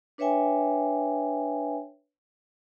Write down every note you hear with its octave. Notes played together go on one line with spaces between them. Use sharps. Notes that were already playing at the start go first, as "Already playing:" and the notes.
D4 B4 C#5 E5 G5 G#5